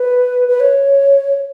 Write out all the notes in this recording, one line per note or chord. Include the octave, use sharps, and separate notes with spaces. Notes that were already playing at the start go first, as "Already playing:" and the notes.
Already playing: B4
B4
C#5